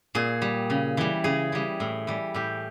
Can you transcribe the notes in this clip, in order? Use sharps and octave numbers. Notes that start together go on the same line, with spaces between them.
A#2 G#4
G3
C#3
E3 G3
C#3 G#4
E3 G3
A2
E3 G3
A2 G4